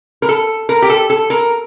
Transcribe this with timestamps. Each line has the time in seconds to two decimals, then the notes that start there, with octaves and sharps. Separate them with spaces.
0.22 A#4
0.29 A4
0.69 A#4
0.82 G4
0.89 A4
1.10 A4
1.30 A#4